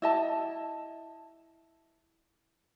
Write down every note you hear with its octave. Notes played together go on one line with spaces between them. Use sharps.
E4 D#5 A5